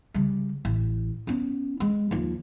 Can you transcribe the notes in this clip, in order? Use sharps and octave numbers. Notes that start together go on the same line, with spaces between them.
C#3 G3
A1
B3 C#4
G#3
D#2 F3